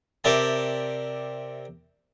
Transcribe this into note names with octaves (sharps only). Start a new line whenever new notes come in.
C3 G4 A#4 D5 E5 A5